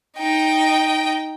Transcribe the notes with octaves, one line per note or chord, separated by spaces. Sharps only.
D#4 G5